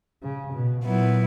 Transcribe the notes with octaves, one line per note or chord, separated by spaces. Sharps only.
C#3
B2
A#2 F#3 B3 E4